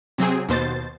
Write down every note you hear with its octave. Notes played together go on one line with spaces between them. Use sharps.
C3 F#3 C4 G#4
D#2 B2 C5 A6